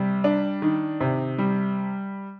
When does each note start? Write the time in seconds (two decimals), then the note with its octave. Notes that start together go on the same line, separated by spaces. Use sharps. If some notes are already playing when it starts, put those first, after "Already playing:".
Already playing: C3 G3
0.24 D4
0.62 D#3
1.00 C3
1.39 G3